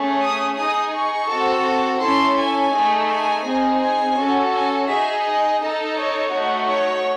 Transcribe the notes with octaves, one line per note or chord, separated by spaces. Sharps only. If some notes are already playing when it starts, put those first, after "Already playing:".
Already playing: A3 C#4 G#4
D#6
D#4 G#4 D#6
C#6
C4 F#4 A4
C#4 E4 A4 C6
G#5
A3 D#4 G#4
G#5
C4 D#4 G#4
G#5
C#4 F#4 A4
G#5
D#4 G#4 E5
D#5
D#4 A4
C#5
A3 D#4 F#4
C#5